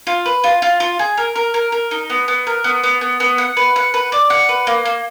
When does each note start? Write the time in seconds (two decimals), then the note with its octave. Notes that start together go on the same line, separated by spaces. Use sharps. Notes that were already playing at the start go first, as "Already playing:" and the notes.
0.07 F4
0.26 B4
0.44 F4
0.62 F4
0.80 F4
0.99 G#4
1.18 A#4
1.36 A#4
1.54 A#4
1.72 A#4
1.91 D#4
2.10 B3
2.28 B3
2.47 A#4
2.64 B3
2.84 B3
3.01 B3
3.20 B3
3.38 F#5
3.57 B4
3.76 F#5
3.94 B4
4.12 D5
4.30 F#5
4.49 B4
4.67 A#3
4.85 A#3